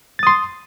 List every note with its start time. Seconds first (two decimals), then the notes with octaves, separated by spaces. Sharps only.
0.19 A6
0.23 D#6
0.27 C6